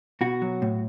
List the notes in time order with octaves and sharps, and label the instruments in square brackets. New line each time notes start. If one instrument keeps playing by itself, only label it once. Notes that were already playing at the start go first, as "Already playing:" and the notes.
[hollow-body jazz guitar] B2 F#4
F#3
A2